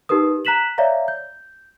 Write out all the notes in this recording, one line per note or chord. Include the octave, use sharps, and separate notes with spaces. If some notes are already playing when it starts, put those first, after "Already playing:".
D#4 G4 A#4 B4 D#6
A#5 F#6 B6 E7 F#7
C#5 D5 E5 F5 A#5
G6